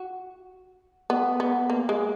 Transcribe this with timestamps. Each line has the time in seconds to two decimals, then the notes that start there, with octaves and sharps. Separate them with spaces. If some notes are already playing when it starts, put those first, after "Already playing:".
Already playing: F#4
1.10 B3
1.40 B3
1.70 A#3
1.89 G#3